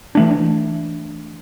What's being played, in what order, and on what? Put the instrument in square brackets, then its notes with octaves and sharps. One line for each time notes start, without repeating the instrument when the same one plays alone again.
[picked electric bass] E3 A3 D4